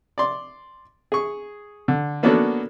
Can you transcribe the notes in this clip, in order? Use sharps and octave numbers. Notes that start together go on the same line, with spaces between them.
D5 C6
G#4 C#6
D3
A#3 B3 C#4 D4 F#4 A4